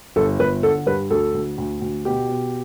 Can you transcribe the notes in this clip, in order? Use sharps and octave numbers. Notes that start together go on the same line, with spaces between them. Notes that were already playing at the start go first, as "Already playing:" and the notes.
G1 A4
G1 B4
D3 A4
G2 B4
D2 A4
D2
D2
D2
B2 G4
B2